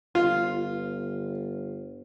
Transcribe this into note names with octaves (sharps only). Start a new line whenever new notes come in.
G1 F4